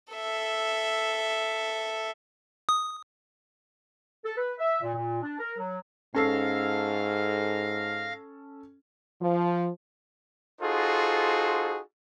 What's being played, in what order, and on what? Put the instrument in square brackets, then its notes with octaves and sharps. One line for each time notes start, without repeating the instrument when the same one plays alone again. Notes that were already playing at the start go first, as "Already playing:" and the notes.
[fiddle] A4 E5
[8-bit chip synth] D#6
[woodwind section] A4
B4
E5
A#2
A#2
D4
A#4
F#3
[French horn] G#2 [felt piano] C#4 A4 C7 [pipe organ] F5 F6 A#6
[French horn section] F3
[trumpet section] D#4 F4 F#4 G#4 A4 C5